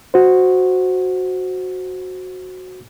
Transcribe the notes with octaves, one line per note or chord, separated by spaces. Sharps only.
F#4 C5